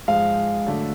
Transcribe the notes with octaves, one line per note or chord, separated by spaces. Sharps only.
G#2 F3 G#3 F5
D3 F#3 A3 D4